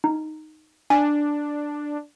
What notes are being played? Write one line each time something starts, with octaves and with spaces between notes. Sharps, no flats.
D#4
D4 G#5